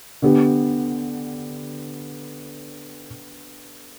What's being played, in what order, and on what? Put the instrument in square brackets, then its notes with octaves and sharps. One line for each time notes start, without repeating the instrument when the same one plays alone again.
[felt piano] D3 B3 G4